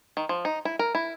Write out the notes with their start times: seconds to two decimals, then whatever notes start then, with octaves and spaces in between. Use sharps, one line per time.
0.17 D#3
0.29 F3
0.45 D#4
0.65 E4
0.79 A#4
0.95 E4